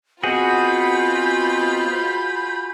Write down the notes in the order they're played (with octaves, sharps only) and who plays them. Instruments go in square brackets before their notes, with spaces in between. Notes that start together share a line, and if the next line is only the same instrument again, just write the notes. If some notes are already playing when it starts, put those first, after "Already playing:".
[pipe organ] B3 C4 D#5 [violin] F4 B5 [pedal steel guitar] F#4 G#4 [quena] G6